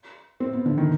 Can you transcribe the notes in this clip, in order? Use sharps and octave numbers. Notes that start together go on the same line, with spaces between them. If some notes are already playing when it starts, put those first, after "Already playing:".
C4
B3
D3
D#3